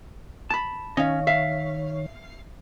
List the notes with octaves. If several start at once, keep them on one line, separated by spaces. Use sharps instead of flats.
A5 B5
D#3 C#4 C#5 D#5 F5
E5 F5